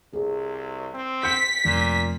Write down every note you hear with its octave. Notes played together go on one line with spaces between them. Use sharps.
C2 G#4
C4
G6 B6 C#7
F1 A#2